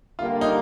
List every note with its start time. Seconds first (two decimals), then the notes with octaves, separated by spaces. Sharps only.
0.19 D3 G3 A#3 F4
0.41 D#4